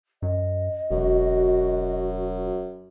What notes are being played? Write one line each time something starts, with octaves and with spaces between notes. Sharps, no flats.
F#2 D#5
E1 F#2 F#4